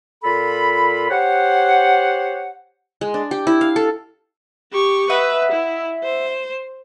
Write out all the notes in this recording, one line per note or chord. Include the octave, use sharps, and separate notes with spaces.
A#2 F4 A4 B5
G4 C5 C#5 F#5
G#3
D4
G4
E4
F5
A4
G4 C#6
B4 D#5 E5 F#5
E4
C5